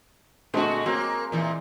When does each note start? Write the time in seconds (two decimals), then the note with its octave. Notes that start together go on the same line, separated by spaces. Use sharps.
0.54 A#2 D3 G#3 A3 C4 F#4
0.86 F#3 A#3 C4
1.32 A#2 E3